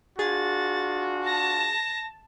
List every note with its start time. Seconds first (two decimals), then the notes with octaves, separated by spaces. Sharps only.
0.19 D4 F4 F#4 G#4 A6
1.26 A5 A#6